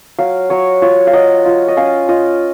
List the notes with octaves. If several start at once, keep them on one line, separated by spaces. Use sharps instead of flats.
F#3 F5
F#3 C#5
F4 C#5
F5
F#3 D#5
F4
D#5
C#4 F5
F4 D#5